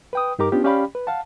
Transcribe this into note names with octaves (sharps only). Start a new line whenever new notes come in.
B4 G5 D#6
G2 D#4 G4 A#4 A#5 D6
B3 C#4 D4 F4 G4
C#4 G4 D5 F5 G5 B5
B4
F5 F#5 A5